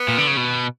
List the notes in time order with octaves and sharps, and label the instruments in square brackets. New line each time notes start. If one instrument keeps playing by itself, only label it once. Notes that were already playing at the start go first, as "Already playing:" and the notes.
Already playing: [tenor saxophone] B3
[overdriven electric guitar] A#2
D3
C#3
B2